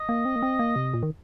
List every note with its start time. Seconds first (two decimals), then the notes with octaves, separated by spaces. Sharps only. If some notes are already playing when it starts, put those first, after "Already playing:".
Already playing: D#5
0.09 A#3
0.25 C4
0.36 A#3
0.43 C4
0.59 A#3
0.76 C3
0.94 A#2
1.03 D#3